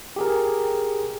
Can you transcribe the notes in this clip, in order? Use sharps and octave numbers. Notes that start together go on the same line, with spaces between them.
G4 G#4 A#4